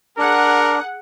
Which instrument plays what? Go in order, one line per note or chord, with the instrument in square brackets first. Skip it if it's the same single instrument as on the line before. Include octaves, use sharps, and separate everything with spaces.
[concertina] D4 [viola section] G#4 F#5 [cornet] A#4